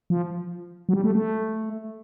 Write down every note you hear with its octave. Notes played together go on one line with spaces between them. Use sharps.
F3
F#3
G3
A3
A3